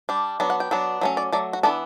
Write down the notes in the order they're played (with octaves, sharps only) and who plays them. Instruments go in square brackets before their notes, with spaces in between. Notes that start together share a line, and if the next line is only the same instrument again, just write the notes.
[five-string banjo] G3 D4
F#3 B3 D4
F#5
G5
F#3 B3 D4
F#3 A3 C#4
D5
F#3 A3 D5
F#4
E3 B3 D4 A4